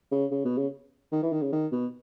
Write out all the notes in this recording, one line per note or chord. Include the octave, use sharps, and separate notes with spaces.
C#3
C#3
B2
C#3
D#3
E3
D#3
C#3
D#3
B2